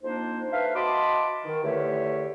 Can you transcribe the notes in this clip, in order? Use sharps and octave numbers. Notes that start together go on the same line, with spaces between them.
F2 A#3 D4 D#4 C5
A4 B4 E5 F5
F#4 D#5 A5 B5 C6 D6
D#3
E2 D3 A3 G4 C#5 E5